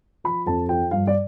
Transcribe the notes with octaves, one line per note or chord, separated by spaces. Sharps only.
F3 B5
F2 A5
F3 G5
G2 F5
D5